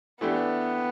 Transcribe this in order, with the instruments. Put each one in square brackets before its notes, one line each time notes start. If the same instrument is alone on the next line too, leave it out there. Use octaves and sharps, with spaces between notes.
[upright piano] E3 A3 D4 G4 [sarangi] B3